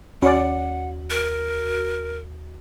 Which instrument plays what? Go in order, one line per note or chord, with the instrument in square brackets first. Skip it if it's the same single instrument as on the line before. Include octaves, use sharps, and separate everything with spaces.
[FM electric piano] D#2 F#4 [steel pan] C#4 D5 [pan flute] F#5
[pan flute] A#4